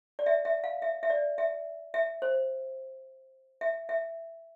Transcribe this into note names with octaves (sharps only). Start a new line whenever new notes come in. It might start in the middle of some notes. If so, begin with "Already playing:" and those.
D5
E5
E5
F5
E5
E5
D5
E5
E5
C5
E5
E5